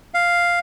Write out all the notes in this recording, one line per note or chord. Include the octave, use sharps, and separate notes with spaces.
F5